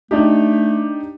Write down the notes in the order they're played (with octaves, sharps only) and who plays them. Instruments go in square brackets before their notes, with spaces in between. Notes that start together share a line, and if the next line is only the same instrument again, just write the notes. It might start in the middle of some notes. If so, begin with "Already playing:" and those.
[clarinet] A3 [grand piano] D4 D#4 G4